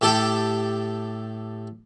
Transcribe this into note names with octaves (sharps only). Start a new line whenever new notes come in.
A2 G4 A4